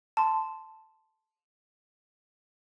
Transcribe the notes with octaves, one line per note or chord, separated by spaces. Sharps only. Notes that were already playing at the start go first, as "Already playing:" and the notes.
A5 C6